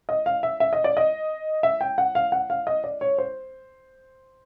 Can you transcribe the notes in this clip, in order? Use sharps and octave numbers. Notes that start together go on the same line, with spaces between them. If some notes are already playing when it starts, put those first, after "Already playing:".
D#5
F5
E5
E5
D#5
D5
D#5
E5
G5
F#5
F5
F#5
F5
D#5
D5
C#5
C5